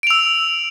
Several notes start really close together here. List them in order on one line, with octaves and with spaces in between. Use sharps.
D7 F7 E6